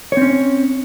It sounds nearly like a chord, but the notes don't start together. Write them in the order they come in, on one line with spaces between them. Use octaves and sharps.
C#5 C4 C#4